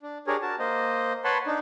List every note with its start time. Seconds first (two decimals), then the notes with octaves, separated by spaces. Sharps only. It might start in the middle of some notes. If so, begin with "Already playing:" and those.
0.02 D4
0.27 D4 G4 G#4 A#4 C#5
0.42 F#4 A#4 A5
0.59 A#3 C5 D#5
1.24 B4 C#5 F#5 A5 B5 C6
1.46 D4 D#4